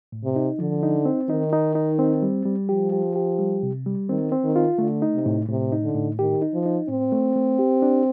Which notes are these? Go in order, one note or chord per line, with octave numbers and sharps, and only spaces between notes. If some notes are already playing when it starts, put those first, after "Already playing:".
A2
C3
D#4
D3 F3
D#4
C4
D#3 D#4
D#4
D#4
C4
G3
G3
F3 G4
G4
G4
G3
C3
G3
D#3 C4
C4
D#3
F4
D3 A3
D#4
C3
A2
A2 C3
D#4
D3
A2
D#3 G4
D#4
F3
D#4
A2 C4
A3
A3
G4
D4